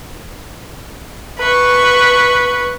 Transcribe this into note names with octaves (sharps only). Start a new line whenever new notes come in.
B4 C#6